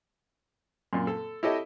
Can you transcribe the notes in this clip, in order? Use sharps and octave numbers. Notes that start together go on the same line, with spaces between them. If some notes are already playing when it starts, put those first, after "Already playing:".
F#2 A#2
A4
E4 G4 A4 C#5 D#5 E5